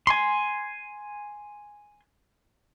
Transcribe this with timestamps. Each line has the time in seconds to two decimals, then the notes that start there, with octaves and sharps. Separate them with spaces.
0.07 G#5 C6